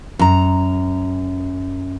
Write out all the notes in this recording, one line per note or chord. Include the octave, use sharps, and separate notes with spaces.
F#2 A#5